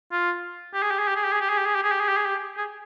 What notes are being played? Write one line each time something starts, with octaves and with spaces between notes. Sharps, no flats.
F4
G4
G#4
G4
G#4
G4
G#4
G4
G#4
G4
G#4
G4
G#4
G4
G#4
G4
G#4
G4
G#4
G4
G#4